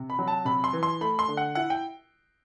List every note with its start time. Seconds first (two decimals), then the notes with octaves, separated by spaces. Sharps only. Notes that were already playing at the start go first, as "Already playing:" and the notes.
Already playing: C3
0.10 B5
0.19 F#3
0.28 A5
0.45 C3 B5
0.64 C6
0.73 E3
0.83 C6
1.01 A3 B5
1.19 C6
1.28 D3
1.37 F#5
1.55 E4 F#5
1.70 G5